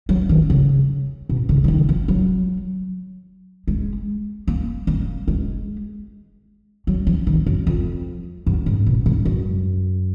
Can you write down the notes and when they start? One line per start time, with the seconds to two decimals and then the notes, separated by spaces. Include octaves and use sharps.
0.09 F#3
0.29 D#3
0.50 C#3
1.29 B2
1.49 C#3
1.64 F3
1.68 D#3
1.89 F3
2.08 F#3
3.67 G#3
4.48 A#3
4.87 A#3
5.28 G#3
6.87 F#3
7.07 F3
7.27 D#3
7.46 F#2
7.67 F2
8.47 F#2
8.66 G#2
8.86 B2
9.06 G#2
9.25 F#2